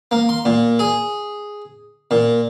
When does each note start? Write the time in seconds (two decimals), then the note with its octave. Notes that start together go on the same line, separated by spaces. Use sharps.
0.11 A#3
0.29 C6
0.45 A#2
0.79 G#4
2.11 A#2